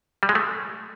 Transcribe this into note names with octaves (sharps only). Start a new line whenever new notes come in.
G3
G#3
A3